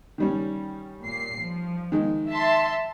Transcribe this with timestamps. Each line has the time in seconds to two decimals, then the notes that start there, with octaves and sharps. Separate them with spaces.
0.18 D#3 G3 C#4
1.02 A#2 C7
1.41 F3
1.92 D#3 G#3
2.29 E5 A5 C6